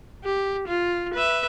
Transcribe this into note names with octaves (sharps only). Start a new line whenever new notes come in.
G4
F4
B4 E5